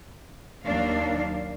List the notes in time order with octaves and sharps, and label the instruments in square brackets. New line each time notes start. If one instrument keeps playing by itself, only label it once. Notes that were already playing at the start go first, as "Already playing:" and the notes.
[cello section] D#2 D#3 F#3 A#3 D4 F5